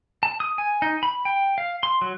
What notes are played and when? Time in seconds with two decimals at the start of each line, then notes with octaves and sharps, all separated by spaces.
0.23 A5
0.40 D#6
0.58 G#5
0.82 D#4
1.03 B5
1.25 G5
1.58 F5
1.83 C6
2.02 F#3